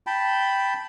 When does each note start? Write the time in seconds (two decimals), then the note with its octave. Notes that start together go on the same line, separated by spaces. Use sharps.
0.07 G5 A5 B5